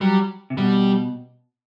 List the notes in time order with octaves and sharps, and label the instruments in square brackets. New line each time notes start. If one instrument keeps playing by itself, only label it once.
[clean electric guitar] F#3 [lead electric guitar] G3
[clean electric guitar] C3
[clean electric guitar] B2 [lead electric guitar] G3